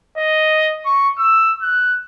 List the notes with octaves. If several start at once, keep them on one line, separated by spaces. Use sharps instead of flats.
D#5
C#6
E6
F#6